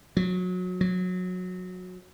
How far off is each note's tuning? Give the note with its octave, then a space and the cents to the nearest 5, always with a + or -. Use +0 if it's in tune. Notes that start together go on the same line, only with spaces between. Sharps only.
F#3 -25
F#3 -20